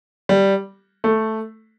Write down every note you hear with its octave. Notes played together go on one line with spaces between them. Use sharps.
G3
A3